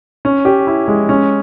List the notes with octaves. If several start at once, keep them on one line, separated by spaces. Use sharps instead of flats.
C#4
G4
E4
G#3
C#4